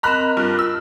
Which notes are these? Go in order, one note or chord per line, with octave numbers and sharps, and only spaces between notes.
C4 A#4 D#5 A#5 B5 F#6
G2 F4
E6